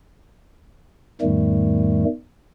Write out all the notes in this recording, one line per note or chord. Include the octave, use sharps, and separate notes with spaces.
E2 G#2 D#3 G3 A3